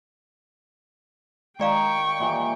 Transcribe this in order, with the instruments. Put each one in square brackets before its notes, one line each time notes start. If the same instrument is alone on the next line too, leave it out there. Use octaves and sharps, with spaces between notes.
[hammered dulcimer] D#3 [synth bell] G#3 D5 F5 [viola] G5 C#6
[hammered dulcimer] A#2 E3 G3